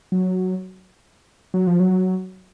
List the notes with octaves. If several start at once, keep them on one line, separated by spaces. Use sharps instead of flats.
F#3
F#3
F3
F#3